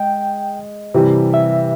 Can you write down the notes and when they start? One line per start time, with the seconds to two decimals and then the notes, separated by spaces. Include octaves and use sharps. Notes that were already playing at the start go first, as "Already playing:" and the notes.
Already playing: G#3 G5
0.94 C3 E3 G3
1.34 E5